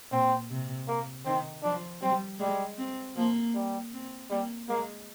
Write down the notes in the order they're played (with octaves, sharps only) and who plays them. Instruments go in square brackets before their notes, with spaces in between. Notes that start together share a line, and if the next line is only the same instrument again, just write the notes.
[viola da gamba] A#2 [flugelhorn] C4
[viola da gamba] C3
[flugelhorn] A#3
[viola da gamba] D#3 [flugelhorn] C4
[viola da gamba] F3 [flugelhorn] D4
[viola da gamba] G3 [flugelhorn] C4
[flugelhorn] G3 [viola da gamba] G#3
[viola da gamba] C4
[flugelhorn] F3 [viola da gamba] A#3
[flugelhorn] G3
[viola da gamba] C4
[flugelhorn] G3 [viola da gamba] A#3
[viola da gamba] G#3 [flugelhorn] A#3